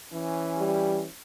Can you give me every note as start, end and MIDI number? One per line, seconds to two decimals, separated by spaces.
0.12 1.07 52
0.12 1.07 61
0.58 1.01 55